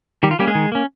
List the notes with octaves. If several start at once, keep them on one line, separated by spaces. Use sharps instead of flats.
D#3 G3 G4
F4
G3 A#3 C#4 G4
G#3 G#4
D#3
A#3 C#4